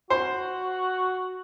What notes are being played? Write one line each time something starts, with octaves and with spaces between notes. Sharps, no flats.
F#4 C5